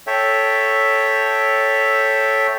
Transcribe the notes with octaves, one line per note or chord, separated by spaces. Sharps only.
A4 C#5 E5 G5